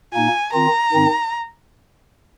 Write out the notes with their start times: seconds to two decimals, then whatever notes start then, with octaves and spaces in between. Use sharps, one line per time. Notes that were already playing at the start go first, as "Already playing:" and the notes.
0.14 A#2 A#3 D#4 G#5
0.53 D#3 C4 F4 A#5
0.92 G#2 D#3 C4 D#4